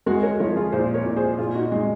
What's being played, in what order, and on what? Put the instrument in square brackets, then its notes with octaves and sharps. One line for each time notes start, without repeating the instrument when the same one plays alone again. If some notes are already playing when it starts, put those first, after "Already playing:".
[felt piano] G#3 [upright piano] F#4 A#4
[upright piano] A#4 C#5
[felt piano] F3 [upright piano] A#4 C#5
[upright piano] F4 G#4
[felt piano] A#2 [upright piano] G#4 C5
[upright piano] A#4 C#5
[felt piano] A#2
[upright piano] G#4 C5
[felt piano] A#2 [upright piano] F4 G#4
[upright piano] D#4 F#4
[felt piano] G#3 [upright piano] D#4